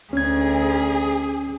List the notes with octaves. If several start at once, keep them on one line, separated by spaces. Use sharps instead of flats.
D2 C#4 G#4 G#6